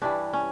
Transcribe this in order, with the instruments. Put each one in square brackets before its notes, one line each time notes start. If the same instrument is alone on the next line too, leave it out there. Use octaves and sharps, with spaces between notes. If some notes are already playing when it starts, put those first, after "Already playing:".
[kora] G2 E3 G3 D4
C#4